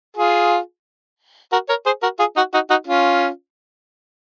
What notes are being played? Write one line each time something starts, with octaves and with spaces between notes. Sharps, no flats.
F4 G#4
F#4 A#4
A#4 C#5
G#4 C5
F#4 A#4
F4 G#4
D#4 F#4
D#4 F#4
D#4 F#4
C#4 F4